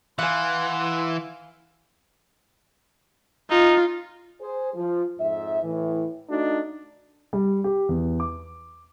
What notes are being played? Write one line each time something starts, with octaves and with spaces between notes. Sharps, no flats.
E3 F5 F#5 G#5 C6
D#4 F4
G#4 C5
F3
F2 G#2 E5
A2 E3
A3 D4 D#4 F#4
G3
G4
E2
D6